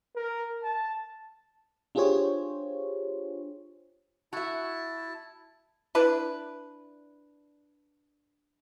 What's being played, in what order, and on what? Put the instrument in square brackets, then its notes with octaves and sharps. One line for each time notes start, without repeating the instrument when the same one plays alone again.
[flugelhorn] A#4
A5
[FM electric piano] D4 F4 G4 G#4 C5 C#5
[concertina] E4 A5 [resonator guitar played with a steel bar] F#4 E5
[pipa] D4 E4 B4